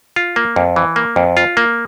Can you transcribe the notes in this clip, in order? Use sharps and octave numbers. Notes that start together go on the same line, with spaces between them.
F4
A#3
F2
E3
A#3
F2
F4
A#3